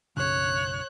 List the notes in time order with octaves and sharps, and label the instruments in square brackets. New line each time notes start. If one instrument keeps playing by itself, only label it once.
[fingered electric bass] B1 F#2 C#3 [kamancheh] C#5 F#6